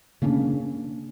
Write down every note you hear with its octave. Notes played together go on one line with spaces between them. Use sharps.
C#3 A#3 C#4 D4